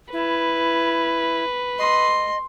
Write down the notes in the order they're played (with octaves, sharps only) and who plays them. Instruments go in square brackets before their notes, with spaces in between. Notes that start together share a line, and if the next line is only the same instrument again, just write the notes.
[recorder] E4 [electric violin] B4
[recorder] D#5 [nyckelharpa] C6